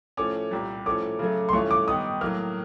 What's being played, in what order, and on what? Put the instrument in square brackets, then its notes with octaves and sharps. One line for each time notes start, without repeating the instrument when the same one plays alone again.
[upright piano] A2 F3 A3 C#4 [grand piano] D6
[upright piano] C2 A#2 G3
[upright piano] A2 F3 A3 C#4 [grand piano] D6
[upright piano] C#3 F#3 A3
[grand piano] C6
[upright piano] G2 E3 A3 C#4 F4 [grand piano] C#6
[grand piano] D6
[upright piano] D#3 G3 B3 D#4 [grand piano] D#6
[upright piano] A2 F#3 A#3 [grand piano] F6